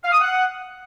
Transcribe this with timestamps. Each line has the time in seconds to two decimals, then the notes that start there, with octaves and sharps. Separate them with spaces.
0.03 F5
0.12 D#6
0.20 F#5